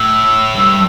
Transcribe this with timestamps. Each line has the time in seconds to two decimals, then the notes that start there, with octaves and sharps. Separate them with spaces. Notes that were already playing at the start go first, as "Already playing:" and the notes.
Already playing: A2 E6
0.55 G2